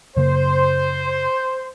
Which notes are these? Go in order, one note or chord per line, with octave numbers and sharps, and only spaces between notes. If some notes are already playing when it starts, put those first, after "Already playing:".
F#2 C#3 A#3 C5